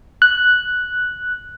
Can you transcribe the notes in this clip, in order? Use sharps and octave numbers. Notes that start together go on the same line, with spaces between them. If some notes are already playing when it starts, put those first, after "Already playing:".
F#6